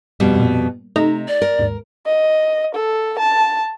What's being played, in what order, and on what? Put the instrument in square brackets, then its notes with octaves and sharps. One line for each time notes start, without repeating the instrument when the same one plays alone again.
[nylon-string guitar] F2 B2 G3
[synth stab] G2 A#2
[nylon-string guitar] C3 [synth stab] A3 D#4 A#5
[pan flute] D5
[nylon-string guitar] A#4
[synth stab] D#2 G#2
[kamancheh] D#5
A4
A5